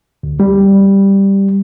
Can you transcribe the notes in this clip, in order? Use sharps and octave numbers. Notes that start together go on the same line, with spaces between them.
D2
G3